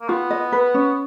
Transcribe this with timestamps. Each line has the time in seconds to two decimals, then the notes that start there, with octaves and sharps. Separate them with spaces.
0.01 A#3
0.09 B3 F4
0.31 D#5
0.52 B4
0.74 C#4